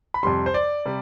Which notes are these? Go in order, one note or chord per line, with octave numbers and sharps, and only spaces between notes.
B5
F2 C3 G3 C6
C5
D5
C3 G3